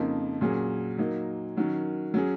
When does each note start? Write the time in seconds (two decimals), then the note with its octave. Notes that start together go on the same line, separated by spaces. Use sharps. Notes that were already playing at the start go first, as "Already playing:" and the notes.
Already playing: F2 C#3 F3 A#3 D#4
0.41 A#2 F#3 C#4 G#4
0.98 F#3 A#3 D#4
1.57 D#3 F#3 C#4
2.14 F#3 C#4 G#4